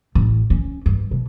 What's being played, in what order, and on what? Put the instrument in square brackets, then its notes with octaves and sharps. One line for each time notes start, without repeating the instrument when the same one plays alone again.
[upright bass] A1
C#4
G2
B2